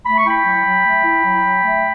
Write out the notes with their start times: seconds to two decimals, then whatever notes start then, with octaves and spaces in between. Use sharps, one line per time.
0.06 A3 B5
0.17 C#6
0.25 E4 G5 B5
0.45 F#3
0.65 F#3
0.85 A3
1.04 E4
1.24 F#3
1.44 F#3
1.64 A3